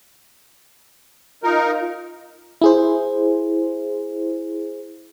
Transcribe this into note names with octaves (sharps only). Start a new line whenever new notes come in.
D#4 F4 A#4
E4 G#4 C5